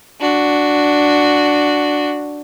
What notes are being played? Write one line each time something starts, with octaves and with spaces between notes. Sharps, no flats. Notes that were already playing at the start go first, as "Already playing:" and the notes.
D4 F#4